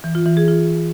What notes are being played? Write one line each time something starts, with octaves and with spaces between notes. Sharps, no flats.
E3
F4
E3
G#4
F4